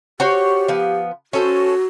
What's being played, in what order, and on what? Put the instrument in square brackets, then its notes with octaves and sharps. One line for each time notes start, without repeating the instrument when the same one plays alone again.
[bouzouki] F#4 C5 C#5 [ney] G4
[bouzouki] F3 B3
[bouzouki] C#4 A4 C5 [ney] F#4